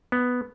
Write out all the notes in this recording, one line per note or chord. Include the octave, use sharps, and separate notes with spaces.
B3